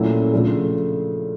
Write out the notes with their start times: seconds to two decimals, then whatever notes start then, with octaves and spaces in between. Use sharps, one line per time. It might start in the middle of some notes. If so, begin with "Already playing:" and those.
Already playing: A#2 F#3 A3 C#4 E4
0.33 C#3 F3 A3 D4